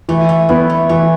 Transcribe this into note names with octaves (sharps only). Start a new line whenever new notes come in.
E3 A3
A3
G3 B3 E4 B4
A3
E3 A3